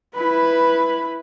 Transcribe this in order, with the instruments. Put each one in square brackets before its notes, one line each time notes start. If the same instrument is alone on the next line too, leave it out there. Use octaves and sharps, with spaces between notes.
[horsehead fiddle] E4 B5 [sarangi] B4